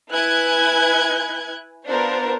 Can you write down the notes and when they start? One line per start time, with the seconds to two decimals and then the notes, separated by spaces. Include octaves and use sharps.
0.10 E4 B4 G#5 F#6 G#6
1.86 B3 D4 F4 A#4 C5